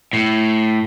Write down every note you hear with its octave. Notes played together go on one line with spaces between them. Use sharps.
A2